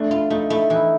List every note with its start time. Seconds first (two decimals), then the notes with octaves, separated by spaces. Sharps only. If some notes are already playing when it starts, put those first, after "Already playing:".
Already playing: A3 D4
0.11 D4 F4
0.30 A3 D#4
0.50 A3 E4
0.70 E3 D#4